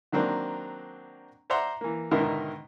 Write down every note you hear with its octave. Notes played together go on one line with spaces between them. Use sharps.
D#3 F#3 A#3 C4 D4
C5 D5 E5 F#5 A#5 C6
E3 A#3
G#2 B2 D3 D#3 E4 A#4